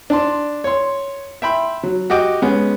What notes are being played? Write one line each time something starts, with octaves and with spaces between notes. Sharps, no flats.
D4 A5 C6
C#5 C6
E5 G5 B5 C6
F#3
F#4 G4 D#5 G5 D6
G#3 B3 C#4